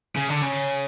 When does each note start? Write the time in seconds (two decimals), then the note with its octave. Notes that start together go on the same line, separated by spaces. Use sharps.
0.17 C#3
0.30 D3
0.43 C#3